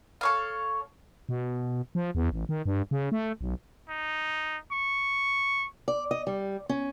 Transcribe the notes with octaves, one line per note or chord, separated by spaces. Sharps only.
A4 C#5 F5
B2
F3
E2
A1
D#3
G2
C#3
A3
B1
D#4
C#6
D5
D#5
G3
C#4